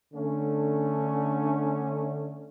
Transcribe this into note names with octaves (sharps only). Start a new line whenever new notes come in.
D3 A3 C#4 D4